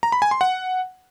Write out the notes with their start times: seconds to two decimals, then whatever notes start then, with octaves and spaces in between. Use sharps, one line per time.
0.03 A#5
0.12 B5
0.22 G#5
0.31 C6
0.41 F#5